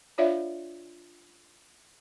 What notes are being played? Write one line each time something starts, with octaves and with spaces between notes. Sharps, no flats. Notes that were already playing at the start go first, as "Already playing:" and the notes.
D4 F4 C#5 D5 E5 F5